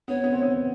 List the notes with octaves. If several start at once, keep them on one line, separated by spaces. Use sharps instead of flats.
B3 C#5
B3
C4
B3